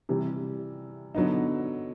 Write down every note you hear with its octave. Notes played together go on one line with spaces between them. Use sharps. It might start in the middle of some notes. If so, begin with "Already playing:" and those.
C3 E3 G3
D3 F#3 B3 D#4